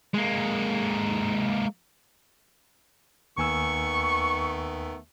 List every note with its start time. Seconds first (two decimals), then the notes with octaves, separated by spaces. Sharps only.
0.14 G#3 A#3
3.38 D#2 D#3 A3 B3 G#5 C#6 E6